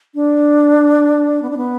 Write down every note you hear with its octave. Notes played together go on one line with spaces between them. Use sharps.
D4
B3
D4
B3